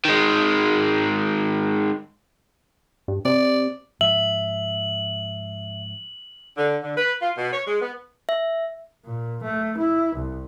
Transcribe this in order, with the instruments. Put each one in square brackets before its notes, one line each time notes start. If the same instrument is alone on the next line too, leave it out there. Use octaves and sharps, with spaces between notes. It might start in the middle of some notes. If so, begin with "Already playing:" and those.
[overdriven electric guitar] D#3 G#3
[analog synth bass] G2
[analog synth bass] C3 [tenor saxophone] D5
[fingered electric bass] G#2 F3 [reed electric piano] E5 [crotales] F#7
[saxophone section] D3
D3
B4
F4
B2
C#5
G#3
B3
[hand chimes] E5
[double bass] A#2
A3
E4
C2